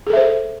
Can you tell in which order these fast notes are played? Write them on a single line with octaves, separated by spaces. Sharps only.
G#4 A4 E5 C5